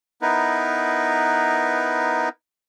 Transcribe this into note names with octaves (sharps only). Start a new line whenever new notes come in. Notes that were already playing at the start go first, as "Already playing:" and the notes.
B3 D#4 E4 A#4 B4